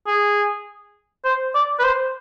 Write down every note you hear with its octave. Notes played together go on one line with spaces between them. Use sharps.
G#4
C5
D5
B4
C5